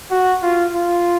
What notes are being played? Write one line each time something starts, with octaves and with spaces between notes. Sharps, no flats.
F#4
F4
F4